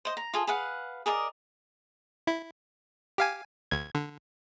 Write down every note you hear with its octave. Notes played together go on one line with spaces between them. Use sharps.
C5 D#5
A#5
F4 G#4 A4
G#4 B4 F5 F#5
G#4 A#4 D5 D#5
E4
G4 F5 G#5
D2 G#6
D3